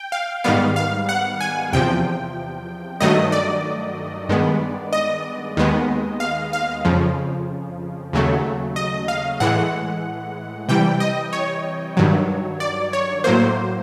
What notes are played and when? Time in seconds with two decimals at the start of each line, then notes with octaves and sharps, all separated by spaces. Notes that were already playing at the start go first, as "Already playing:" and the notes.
Already playing: G5
0.12 F5
0.44 G#2 D#3 G3 B3 F5
0.76 F5
1.09 F#5
1.41 G#5
1.73 E2 C3 F3 G5
3.00 G2 D#3 F#3 A3 D#5
3.32 D5
4.29 G2 D#3 G#3 B3
4.93 D#5
5.57 D#2 D#3 G#3 B3
6.20 F5
6.53 F5
6.85 F2 C#3 F3
8.13 D#2 C#3 F#3 A3
8.76 D#5
9.08 F5
9.40 A2 E3 G#3 F#5
10.69 C3 E3 G3 G5
11.00 D#5
11.33 C#5
11.97 G2 D#3 F#3
12.60 D5
12.93 C#5
13.24 A2 F#3 A#3 C5